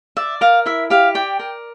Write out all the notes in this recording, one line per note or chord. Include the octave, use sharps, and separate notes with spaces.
D5 E5
A#4 F5
E4 E5
G4 F5
D5 G5
A#4